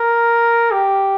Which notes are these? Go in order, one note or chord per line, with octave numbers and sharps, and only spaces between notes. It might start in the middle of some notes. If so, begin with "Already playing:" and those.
Already playing: A#4
G4